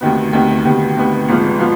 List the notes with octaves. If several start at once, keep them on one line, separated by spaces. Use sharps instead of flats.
D2 C3 D#3 B3
D2 C3 D#3 B3
D2 C3 D#3 B3
D2 C3 D#3 B3
G#1 G#2 F3 B3 F4
F3 B3 F4